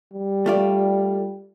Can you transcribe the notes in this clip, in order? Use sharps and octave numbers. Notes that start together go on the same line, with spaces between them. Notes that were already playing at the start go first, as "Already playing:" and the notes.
G3
A3 F4 D5